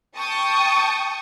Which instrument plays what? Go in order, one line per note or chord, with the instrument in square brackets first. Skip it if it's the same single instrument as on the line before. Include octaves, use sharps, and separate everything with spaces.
[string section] G5 A5 C#6 D#6